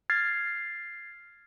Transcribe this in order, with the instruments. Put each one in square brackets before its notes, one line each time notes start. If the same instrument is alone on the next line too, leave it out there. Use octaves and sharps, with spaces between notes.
[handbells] F6 G#6 A6 C7